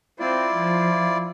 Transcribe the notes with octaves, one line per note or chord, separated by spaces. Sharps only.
C4 E4 F4 D5
F3